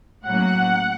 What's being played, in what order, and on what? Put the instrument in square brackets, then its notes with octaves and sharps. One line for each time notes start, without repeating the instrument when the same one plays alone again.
[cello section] A2 F#3 A#3 C#4 [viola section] F#5